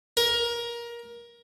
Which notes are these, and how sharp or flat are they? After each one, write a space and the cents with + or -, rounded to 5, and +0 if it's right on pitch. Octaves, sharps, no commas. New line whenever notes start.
A#4 +20